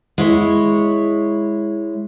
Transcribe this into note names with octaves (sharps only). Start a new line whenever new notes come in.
G#3 E4 C#5